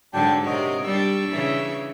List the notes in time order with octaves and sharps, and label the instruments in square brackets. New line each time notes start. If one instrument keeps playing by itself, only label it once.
[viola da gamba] G#2 D3 F#3 [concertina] D4 G5
[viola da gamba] C3 A#4 [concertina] F#4 C#5 D#5
[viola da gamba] G3 D4 [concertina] C#6 E6
[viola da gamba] C#3 E3